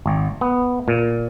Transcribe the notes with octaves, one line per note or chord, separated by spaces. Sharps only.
G#1
B3
A#2